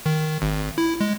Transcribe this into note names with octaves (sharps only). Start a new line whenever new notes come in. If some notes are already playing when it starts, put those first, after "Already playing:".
D#3
G#1
E4
G#3